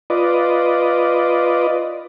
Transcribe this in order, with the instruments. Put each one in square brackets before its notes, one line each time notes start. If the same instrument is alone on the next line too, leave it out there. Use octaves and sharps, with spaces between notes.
[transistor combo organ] F4 B4 D5 D#5